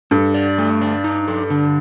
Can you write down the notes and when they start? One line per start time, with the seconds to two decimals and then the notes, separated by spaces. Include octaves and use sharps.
0.11 G2 A4
0.34 D5
0.58 A3
0.81 D4
1.04 D#4
1.28 A4
1.50 D3